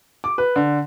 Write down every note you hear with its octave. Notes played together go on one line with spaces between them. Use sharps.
D6
B4
D3